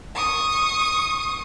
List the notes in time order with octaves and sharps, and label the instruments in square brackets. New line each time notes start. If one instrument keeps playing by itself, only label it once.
[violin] C#6 D#6